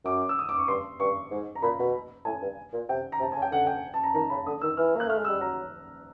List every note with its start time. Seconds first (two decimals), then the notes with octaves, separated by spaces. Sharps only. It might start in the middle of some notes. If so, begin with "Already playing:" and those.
0.04 F#2 D6
0.29 E6
0.39 D#6
0.49 D6
0.58 C#6
0.68 G2 C6
1.00 G2 C#6
1.31 G#2
1.55 A#5
1.62 A#2 B5
1.79 B2
2.25 A2 G#5
2.42 G2
2.73 A#2
2.89 C3 G5
3.12 A#5
3.20 C3
3.22 A5
3.32 C#3 G#5
3.42 G5
3.51 D3 F#5
3.67 G5
3.94 A5
4.04 A#5
4.14 D#3 A#5
4.30 C#3 B5
4.46 D3 D#6
4.62 D#3 E6
4.77 E3 F6
4.96 A#3 F#6
5.07 A3 F6
5.18 G#3
5.25 E6
5.29 G3
5.40 F#3 A#5